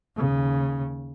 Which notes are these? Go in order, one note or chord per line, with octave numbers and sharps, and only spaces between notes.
D#2 C#3